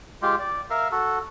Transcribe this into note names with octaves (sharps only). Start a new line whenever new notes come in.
G#3 F4 G4
D5
A#4 E5 F5
F#4 A4